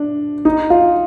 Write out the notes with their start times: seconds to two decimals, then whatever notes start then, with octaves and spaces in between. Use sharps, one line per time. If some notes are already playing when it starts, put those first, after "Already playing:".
Already playing: D4
0.45 D#4
0.70 F4